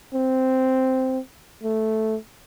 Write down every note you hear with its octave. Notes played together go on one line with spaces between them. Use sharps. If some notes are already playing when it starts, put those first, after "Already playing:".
C4
A3